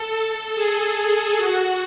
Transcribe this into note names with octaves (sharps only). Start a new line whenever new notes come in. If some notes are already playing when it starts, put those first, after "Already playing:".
Already playing: A4
G#4
F#4